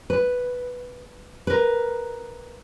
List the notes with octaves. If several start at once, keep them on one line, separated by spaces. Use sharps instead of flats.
B4
A#4 B4